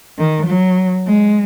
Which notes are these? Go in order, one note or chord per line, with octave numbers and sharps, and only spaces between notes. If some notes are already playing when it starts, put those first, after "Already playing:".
D#3
F#3
G#3